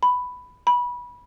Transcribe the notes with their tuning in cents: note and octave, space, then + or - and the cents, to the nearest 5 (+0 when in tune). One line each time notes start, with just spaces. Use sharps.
B5 +5
B5 -20